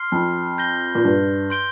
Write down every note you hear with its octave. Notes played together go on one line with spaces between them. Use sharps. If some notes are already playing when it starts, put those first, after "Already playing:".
Already playing: C6 F6 C7 G7
F2
G6 A#6 G7
A#2
G2
C6 G6 D7 G7